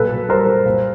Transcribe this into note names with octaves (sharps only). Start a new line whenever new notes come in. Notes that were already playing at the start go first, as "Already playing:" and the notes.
Already playing: A#2 F#3 A4 B4
A#2
G3 A#4 C5
G3
A#2